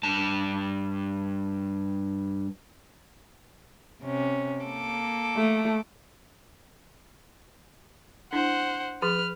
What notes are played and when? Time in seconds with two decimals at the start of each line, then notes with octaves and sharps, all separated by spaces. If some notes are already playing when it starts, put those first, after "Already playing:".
0.03 G2 A5
4.04 C3 C#4
4.63 A#3 A4 D6
5.37 A3
8.33 D4 E4 C5 F#5
9.02 F3 G#4 B4 F6